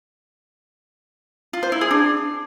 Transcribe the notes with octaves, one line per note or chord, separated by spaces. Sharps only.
F4
C5
E4
G#4
D4